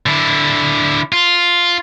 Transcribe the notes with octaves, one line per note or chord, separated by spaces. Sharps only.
D3 E4
F4